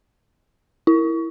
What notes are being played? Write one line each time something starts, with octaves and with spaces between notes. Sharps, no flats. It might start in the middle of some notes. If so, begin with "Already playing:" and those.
E4